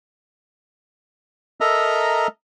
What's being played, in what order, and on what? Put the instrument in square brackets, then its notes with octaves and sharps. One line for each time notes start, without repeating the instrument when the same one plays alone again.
[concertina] A4 A#4 D#5 E5 A#5